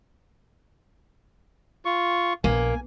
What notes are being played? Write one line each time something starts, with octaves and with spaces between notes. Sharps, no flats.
F4 C#6
A#1 A#3 G#5